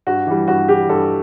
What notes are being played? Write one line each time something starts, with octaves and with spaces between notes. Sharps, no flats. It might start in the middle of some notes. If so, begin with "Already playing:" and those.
G2 F#4
E3 G3
G2 F#4
E3 G3 G4
G2 A4